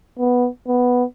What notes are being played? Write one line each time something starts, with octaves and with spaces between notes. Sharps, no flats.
B3
B3